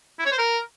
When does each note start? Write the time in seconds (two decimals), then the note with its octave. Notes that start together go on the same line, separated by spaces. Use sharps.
0.19 E4
0.26 C#5
0.32 C5
0.38 A#4